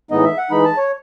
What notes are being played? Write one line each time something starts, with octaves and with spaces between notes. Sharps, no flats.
A2 E3 G#3 B3 D#4 D#5
E5
F#5
E3 G#3 D#4 B5
A5
C#5